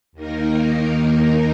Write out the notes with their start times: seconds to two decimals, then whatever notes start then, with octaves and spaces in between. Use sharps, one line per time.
0.12 D#2 D#3 A#3 D#4 A#4